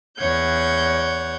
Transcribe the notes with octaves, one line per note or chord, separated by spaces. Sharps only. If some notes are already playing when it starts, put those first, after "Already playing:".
E2 C#5 F#5 G6 G#6